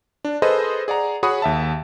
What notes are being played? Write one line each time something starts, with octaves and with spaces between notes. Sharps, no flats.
D4
G#4 A4 B4 C5 D#5
G#4 D5 F#5 A#5
F#4 G#4 C#5 F#5 B5 D#6
D#2 E5 A5